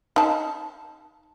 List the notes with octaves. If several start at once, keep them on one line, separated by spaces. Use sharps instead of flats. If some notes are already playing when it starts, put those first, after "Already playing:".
D#4 A5